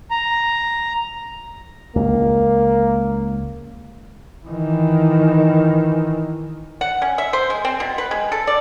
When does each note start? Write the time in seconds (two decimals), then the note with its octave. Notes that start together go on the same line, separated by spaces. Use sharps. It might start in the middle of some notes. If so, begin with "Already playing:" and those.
0.11 A#5
1.96 C#2 A#3
4.46 D#3 E3
6.81 F#5
7.02 C#4
7.18 E5
7.33 C5
7.50 G#3
7.65 C4
7.80 B2
7.98 B4
8.11 G#3
8.32 A4
8.47 D5